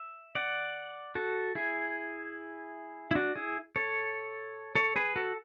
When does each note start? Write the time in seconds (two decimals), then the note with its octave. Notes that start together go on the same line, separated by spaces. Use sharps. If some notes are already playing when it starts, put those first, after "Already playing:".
Already playing: E5
0.35 D5 F#5
1.15 F#4 A4
1.55 E4 G#4
3.11 E4
3.15 D4 F#4
3.35 E4 G#4
3.76 A4 C#5
4.75 A4 C#5
4.96 G#4 B4
5.16 F#4 A4